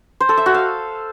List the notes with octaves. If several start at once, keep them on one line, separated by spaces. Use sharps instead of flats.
C5
A4
E5
F#4
F5